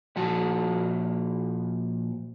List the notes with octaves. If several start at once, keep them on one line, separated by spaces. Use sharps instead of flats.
A#2 F3 F#4 A5